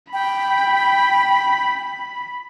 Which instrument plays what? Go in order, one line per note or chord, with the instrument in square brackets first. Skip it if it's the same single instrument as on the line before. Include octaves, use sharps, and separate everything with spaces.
[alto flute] G5 [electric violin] B5